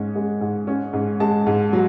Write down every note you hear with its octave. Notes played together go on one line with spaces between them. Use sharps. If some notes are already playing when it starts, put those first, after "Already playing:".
Already playing: G#2 G#3 C#4
G#3
G#2
C#4
G#2
G#3 A5
G#2
F#3